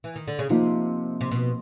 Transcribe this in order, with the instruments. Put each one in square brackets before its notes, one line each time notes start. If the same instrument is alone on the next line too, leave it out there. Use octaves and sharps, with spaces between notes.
[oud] E3
D#3
D3
C#3
[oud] C3 [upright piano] F3 A#3 D#4
[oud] C3
B2